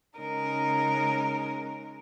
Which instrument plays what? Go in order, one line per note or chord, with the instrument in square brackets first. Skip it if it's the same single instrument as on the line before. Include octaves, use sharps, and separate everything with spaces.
[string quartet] C#3 G#3 D#4 A#4